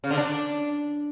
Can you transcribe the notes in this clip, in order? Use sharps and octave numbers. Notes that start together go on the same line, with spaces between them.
C#3
D3
D4